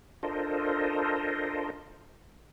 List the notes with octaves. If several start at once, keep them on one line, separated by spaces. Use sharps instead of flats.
D4 F4 A4 A#4 C5 D#5